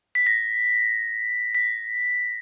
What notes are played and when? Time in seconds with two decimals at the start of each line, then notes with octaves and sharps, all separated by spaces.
0.15 B6
0.27 A#6
1.55 B6